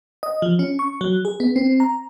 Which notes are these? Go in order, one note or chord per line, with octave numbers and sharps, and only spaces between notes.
D#5
F3
C#4
C#6
F#3
G#4
B3
C4
A#5